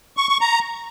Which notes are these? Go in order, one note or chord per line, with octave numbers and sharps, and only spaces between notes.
C#6
C#6
A#5